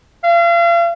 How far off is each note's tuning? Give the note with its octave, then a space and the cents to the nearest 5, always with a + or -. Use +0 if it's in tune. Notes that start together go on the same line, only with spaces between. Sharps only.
F5 -40